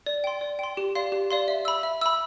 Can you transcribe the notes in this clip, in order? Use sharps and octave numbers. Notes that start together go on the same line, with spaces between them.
D5
G5 C6
D5
G5 C6
G4
D5 F5 C6
G4
D5 F5 C6
E5
B5 E6
E5
B5 E6